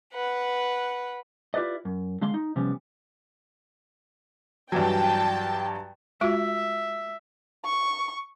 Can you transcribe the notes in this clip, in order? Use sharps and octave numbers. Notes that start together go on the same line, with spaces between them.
B4 F#5
E4 F4 G4 B4 D5 D#5
F#2
D3 G#3 F5 C6
D#4
C3 F3 G3 B3 C#4
G2 E3 F#3 G5 A5
G#3 F4 F#4 E5
C#6